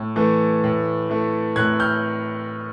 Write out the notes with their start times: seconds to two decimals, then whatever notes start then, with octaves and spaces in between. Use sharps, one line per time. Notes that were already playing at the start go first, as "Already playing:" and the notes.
Already playing: A2
0.16 E3 A3
0.64 A2
1.10 E3 A3
1.56 A2 F#6 G#6
1.80 F6 G6